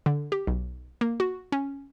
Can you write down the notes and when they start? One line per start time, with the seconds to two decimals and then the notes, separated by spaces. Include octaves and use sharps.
0.06 D3
0.32 G4
0.47 B1
1.01 A#3
1.20 F#4
1.52 C#4